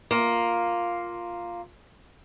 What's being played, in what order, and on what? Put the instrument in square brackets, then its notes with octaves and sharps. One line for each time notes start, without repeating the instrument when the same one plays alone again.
[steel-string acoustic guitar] A#3 F4